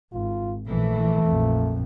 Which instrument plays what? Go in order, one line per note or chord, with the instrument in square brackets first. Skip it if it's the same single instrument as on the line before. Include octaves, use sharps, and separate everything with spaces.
[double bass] G#1 [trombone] F4
[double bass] A#1 [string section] E3 [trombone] A3
[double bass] A#1 F2